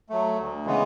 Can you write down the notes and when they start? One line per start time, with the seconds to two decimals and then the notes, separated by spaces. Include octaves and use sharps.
0.09 F#3 A3
0.38 D2
0.65 C#3 E3 G#3 B3